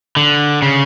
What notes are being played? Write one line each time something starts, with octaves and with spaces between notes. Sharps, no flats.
D3
C#3